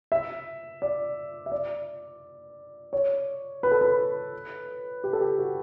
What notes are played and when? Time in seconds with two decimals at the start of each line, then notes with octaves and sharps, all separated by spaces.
0.12 E5
0.82 D5
1.46 E5
1.52 D5
2.93 C#5
3.63 B4
3.72 A4
3.81 B4
5.04 G4
5.13 A4
5.21 G4
5.38 F#4